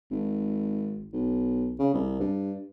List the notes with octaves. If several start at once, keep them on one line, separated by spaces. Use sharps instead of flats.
G#1
B1
C#3
C2
G2